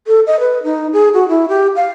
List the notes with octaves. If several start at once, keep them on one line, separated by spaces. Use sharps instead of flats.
A4
D#5
B4
D#4
G#4
F#4
E4
G4
F5